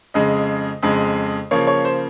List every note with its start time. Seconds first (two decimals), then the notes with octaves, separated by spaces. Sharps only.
0.14 F2 C#3 G#3 D#5
0.83 F2 C#3 G#3
1.51 C#3 F3 A#3 C#5
1.67 C#5
1.85 C5